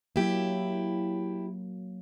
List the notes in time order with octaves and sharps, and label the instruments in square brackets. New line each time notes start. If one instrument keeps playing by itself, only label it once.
[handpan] F#3 A#3 [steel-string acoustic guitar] E4 G4